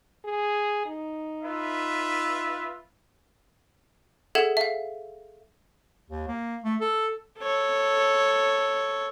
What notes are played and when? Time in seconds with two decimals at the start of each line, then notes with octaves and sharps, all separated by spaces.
0.25 G#4
0.86 D#4
1.43 F4 B4 E5
4.35 G#4 A4 E5 F#5 G#6 E7
4.57 E5 F5
6.10 D#2
6.28 A#3
6.64 A3
6.81 A4
7.39 A4 C#5